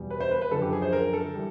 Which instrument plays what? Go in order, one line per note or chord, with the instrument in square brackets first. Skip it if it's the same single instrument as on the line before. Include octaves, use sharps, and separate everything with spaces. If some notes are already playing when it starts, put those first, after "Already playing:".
Already playing: [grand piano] E2 B2 G3
B4
C5
B4
B4
F#2 D3 F3 A4
G4
G#4
C5
A#4
A4
E3 G3